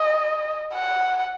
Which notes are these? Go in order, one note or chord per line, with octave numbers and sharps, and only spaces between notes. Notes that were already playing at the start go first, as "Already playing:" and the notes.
Already playing: D#5
F#5